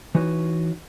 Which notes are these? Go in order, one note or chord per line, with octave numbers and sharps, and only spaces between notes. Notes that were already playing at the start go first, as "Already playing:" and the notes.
E3 D#4 F#4 B4 C#5